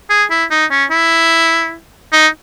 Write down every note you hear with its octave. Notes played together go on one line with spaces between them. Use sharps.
G#4
E4
D#4
C#4
E4
D#4